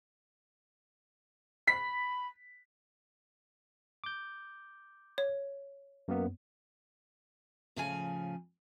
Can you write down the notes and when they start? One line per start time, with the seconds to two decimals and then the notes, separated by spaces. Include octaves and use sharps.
1.67 B5 B6
4.04 D6 G6
5.18 C#5
6.08 F#2 A#3 B3
7.76 A2 C#3 F3 G#5